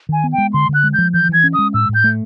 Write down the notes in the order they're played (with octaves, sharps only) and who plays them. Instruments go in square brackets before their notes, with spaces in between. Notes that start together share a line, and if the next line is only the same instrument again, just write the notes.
[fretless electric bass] D#3 [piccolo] G#5
[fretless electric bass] B3
[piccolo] G5
[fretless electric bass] G#3
[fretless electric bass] D3 [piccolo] C6
[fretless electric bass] D3
[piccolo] F#6
[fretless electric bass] G#3
[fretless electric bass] F3 [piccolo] G6
[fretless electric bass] E3 [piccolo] G6
[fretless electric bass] E3 [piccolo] G#6
[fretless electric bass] C#4
[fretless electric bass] G#3 [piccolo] D#6
[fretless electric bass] A2 [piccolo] E6
[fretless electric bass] A2
[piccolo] G6
[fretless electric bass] A3